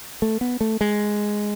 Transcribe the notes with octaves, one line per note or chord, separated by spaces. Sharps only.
A3
B3
A3
G#3